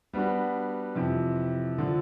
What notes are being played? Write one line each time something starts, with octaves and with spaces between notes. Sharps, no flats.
G3 B3 D4 F#4
F2 C3 E3
D3 F3